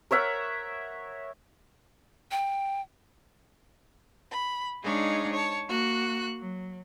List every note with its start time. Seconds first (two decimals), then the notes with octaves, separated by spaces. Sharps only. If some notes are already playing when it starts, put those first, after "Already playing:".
0.11 A#4 C#5 E5 F#5
2.31 G5
4.32 B5
4.83 G#3 D4 D#4 G#4 C#5 F5
5.31 C#5 A5
5.67 A#3 F#4 F#6
6.39 F#3